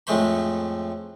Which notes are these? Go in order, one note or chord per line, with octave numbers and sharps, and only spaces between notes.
F2 A2 G#3 A3 C5 B5